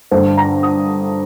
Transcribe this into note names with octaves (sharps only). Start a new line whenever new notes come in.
G2 D3 A3 C5
A#5
D#6